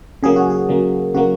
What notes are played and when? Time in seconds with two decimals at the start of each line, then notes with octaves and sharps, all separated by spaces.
0.23 C#3 F#3 A#3 G#4
0.36 F#4
0.50 G#4
0.69 C#3 F#3 A#3
1.14 C#3 F#3 A#3 F#4